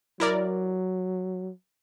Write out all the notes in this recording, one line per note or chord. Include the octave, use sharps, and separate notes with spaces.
F#3 E4 A#4 D5